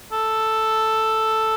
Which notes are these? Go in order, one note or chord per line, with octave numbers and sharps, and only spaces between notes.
A4